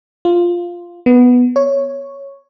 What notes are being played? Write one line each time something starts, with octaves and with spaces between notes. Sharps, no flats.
F4
B3
C#5